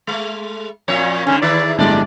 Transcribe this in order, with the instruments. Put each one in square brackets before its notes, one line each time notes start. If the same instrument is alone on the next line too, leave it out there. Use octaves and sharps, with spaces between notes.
[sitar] G#3 A3
F2 A#2 C#5
[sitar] G2 B2 D3 [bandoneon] C#4
[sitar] E2 D#3 E4 [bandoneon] D5
[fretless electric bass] G1 A2 G#3 [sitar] F2 G3 D5 [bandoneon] D4